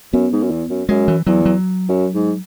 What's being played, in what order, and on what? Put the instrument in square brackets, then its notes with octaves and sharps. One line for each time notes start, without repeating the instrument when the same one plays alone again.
[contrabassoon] F#2 [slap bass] B3
[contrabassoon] G#2
F#2
E2
F#2
[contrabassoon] F#2 [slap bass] G#3
[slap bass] E3
[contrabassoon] E2 [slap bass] F#3
[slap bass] F#3
[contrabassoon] F#2
G#2